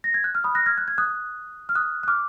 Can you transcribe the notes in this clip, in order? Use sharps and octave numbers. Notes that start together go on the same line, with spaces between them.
A#6
G#6
F#6
F6
B5 D#6
F#6 A#6
F6 G#6
F#6
G#6
D#6 F#6
F6
D#6 F#6
F#6
D6 F6